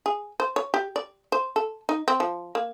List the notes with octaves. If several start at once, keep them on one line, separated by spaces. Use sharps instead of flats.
G#4
C5
C#5
G4
D5
C5
A4
D#4
C4
F3
A#3